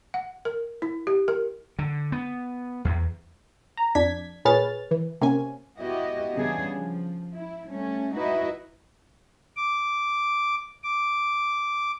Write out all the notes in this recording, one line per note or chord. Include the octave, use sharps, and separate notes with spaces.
F#5
A#4
E4
G4
A#4
D3
B3
E2
A#5
F2 D4 G#6 B6
A#2 G#4 B4 C#5 F6 A6
E3
C3 A#3 C#4 G#5
B3 E4 F#4 G4 D#5
C#3 E3 G3 B3 D4 G#4
F3
E4
G3 A3 C#4
D#4 E4 F#4 B4 D#5 E5
D6
D6